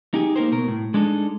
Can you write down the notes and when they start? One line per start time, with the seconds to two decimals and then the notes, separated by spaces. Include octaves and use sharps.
0.14 D#4 G4 G#4
0.36 A#3 D#4 A#4 C5
0.51 C2 B2 A#4
0.68 A2
0.94 G#3 D4 D#4 A4